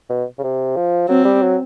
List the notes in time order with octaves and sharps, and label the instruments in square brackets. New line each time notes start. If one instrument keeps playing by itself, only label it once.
[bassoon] B2
C#3
C3
F3
[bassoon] F#3 [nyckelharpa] C4
[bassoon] G3
F#3